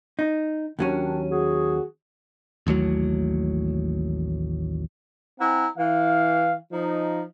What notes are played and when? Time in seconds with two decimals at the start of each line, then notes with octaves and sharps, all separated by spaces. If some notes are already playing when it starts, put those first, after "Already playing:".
0.19 D#4
0.79 D#2 D#3 F#3 C#4 D4
1.29 F#4 G#4
2.67 A1 D#2 A2 F#3
5.40 C4 E4 F#5 G#5 A#5
5.78 E3 F5
6.72 F3 D#4